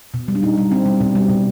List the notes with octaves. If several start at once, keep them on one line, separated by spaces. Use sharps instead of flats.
B2
G3
D4
B2 D#4
G3
B2 C4
G3
B2
G3
B2